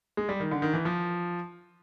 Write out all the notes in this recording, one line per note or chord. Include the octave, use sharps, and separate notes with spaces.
G#3
G3
D#3
D3
D#3
E3
F3